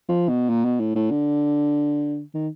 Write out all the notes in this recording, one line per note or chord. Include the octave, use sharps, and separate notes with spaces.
F3
B2
A#2
B2
A2
A2
D3
D#3